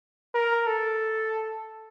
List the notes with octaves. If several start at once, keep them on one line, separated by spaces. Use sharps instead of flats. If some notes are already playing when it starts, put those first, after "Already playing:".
A#4
A4